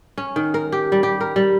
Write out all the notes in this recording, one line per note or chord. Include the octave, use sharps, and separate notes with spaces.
C#4
D#3
A#4
G4
G3
G4
A#4
G3